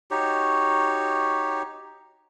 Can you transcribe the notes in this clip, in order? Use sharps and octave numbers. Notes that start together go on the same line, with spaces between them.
D#4 F#4 G4 C#5